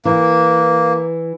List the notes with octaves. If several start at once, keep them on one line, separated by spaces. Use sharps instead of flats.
E3 A#3